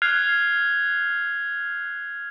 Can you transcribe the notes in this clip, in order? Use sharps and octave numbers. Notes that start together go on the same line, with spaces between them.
F6 F#6 G#6 C7 F7